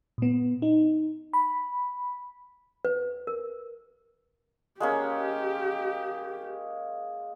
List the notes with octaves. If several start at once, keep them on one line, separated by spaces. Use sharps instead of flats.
A#2 B3
D#4
B5
B4
A#4
G#3 A#3 C#4 G4